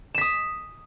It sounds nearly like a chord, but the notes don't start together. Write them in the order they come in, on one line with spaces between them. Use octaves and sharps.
E7 B6 D#6